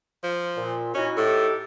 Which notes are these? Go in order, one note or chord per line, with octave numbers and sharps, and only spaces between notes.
F3
A#2
C#4 D#4 E4 F#4
A2 D#4 G4 A4